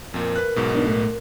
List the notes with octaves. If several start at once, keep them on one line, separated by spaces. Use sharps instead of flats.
F2 A#2 A#4
B4 F#6
B1 G#2 B2
B3 D4 D#4
A2 A3